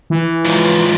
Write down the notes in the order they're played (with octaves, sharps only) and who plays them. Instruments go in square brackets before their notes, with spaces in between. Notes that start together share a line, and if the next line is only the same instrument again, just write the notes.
[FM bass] E3
[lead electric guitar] G#2 F3